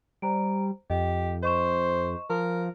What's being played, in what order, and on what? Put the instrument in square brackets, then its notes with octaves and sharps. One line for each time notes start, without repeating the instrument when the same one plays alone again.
[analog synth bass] G3 [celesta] C5 A#5 D7
[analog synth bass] F2 [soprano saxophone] G4 [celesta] D#5
[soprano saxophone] C5 [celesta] D#5 C#6 E7
[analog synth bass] F3 [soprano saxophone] A#4